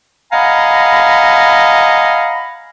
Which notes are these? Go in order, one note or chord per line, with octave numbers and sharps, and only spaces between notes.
D#5 F5 F#5 G#5 A#5 B5